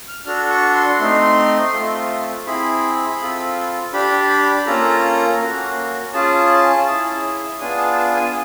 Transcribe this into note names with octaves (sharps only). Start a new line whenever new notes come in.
F6
D4 F#4 A4 F6
C#6
C6
A3 C4 D#4 C6
A3 C4 F4 A4
C4 E4 G#4 B5
C4 F4 A4
D4 G4 B5
B5
A#3 C#4 F4 A4 A#5
A#3 C#4 F#4
C#4 F4 G#4 A5
C#4 E4 G#4
B3 D4 F4 G#4 G#5
A5
A5
G#5